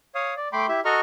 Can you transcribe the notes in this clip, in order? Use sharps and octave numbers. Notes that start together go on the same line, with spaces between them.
C#5 F5 D#6
D5
A3 G5 B5 C6 D6
E4 G4 E5
F#4 A4 D#5 A#5 C#6 F6